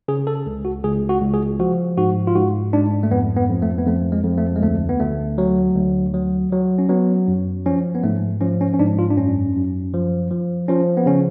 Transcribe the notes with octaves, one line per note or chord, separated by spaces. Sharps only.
C#3 G#4
A4
C#2
F#4
C#2 G#4
F#4
C#2
G#4
F3 F#4
G#2 F#4
F4
G#2 F#4
G#2 D4
A3
F2 B3
B3
F2
A3
B3
F2 A3
G#3
F2
A3
G#3
D2 A3
B3
D2 A3
F#3
D2
F#3
F#3
C#4
F#3 B3
F#2
F3 C#4
B3
G#2 A3
F3 C#4
C#4
C#4
G#2 D4
F4
D4
F#2 C#4
F#2
F3
F3
F3 C#4
B3
C#3 C#4